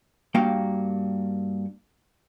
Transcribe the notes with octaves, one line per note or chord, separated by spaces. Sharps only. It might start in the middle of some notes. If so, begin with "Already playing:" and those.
G2 A#3 F#4 F5 G5